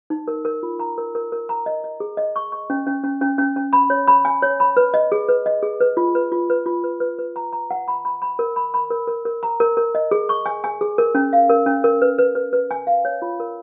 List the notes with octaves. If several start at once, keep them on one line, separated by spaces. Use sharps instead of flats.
D#4
A#4
A#4
F4
A#5
A#4
A#4
A#4
A#5
D#5
D#5
G#4
D#5
C#6
C#6
C#4
C#4
C#4
C#4
C#4
C#4
B5
C#5
B5
G#5
C#5
B5
B4
D#5
G#4
B4
D#5
G#4
B4
F4
B4
F4
B4
F4
B4
B4
B4
A#5
A#5
F#5
B5
B5
B5
A#4
B5
B5
A#4
A#4
A#4
A#5
A#4
A#4
D#5
G#4
C#6
G#5
G#5
G#4
A#4
C#4
F5
A#4
C#4
A#4
B4
B4
B4
B4
G#5
F5
C#5
F4
A#4